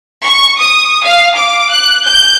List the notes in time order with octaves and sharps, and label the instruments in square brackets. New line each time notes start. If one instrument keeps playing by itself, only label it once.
[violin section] C#6
D#6
F5
D6
F#6
G6